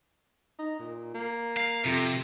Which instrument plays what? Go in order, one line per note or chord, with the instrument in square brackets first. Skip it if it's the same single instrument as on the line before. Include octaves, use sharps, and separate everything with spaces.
[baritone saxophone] D#4
A#2
A#3
[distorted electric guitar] F5
[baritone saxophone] F2 [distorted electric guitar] C3